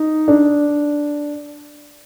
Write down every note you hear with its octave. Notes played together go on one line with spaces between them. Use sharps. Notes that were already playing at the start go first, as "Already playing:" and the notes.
Already playing: D#4
D4